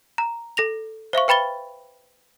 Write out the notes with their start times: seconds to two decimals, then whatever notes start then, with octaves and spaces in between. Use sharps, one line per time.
0.18 A#5
0.57 A4 A#6 F7
1.13 C5 E5 F5 C#6
1.28 B4 G5 B5 A6 G7